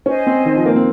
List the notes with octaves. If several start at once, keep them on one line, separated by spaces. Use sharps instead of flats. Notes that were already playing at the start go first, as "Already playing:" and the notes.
C#4 C5 D#5 G#5
C4
D#3
F3
A#3
C4